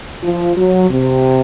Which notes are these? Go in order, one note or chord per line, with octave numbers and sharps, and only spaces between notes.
F3
F#3
C3